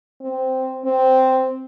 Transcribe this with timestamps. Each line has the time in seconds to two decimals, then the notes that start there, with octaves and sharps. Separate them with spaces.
0.22 C4
0.85 C4